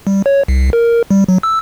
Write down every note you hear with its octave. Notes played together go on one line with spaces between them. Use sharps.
G3
C#5
C2
A#4
G3
F#3
E6